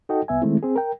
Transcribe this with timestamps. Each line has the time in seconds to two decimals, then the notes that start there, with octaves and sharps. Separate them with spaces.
0.09 D#4 F#4 A4 D#5 G5
0.28 C2 B3 E5 G#5
0.42 D#3 G#3 A3 C4 E4
0.63 C4 G#4
0.76 A#4 G5